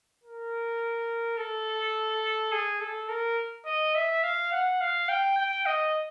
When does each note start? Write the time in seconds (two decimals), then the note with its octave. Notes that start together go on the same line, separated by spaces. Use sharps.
0.24 A#4
1.37 A4
2.52 G#4
2.81 A4
3.09 A#4
3.66 D#5
3.95 E5
4.23 F5
4.52 F#5
4.81 F5
5.09 G5
5.38 G5
5.66 D#5